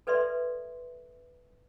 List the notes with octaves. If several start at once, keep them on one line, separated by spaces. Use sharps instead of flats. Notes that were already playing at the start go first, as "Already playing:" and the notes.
A4 B4 D5 E5 C6